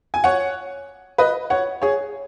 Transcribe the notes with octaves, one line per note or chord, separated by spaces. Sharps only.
G#5
C#5 F#5
B4 D#5
C#5 F#5
G#4 C#5